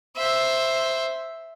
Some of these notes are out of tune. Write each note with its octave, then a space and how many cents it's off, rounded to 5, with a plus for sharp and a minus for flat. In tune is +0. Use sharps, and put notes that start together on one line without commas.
C5 +5 E5 +0